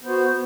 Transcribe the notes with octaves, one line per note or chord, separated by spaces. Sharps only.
B3 F#4 C5